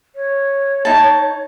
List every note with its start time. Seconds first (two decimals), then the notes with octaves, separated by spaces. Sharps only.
0.16 C#5
0.85 D#4 A5